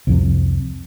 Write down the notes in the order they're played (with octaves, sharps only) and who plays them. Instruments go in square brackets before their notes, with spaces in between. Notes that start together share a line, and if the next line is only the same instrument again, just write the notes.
[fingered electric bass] C2 F2 C3